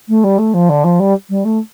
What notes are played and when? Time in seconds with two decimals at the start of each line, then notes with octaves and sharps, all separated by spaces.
0.08 A3
0.24 G3
0.38 A3
0.54 F3
0.69 D3
0.84 F3
0.99 G3
1.29 G3
1.44 A3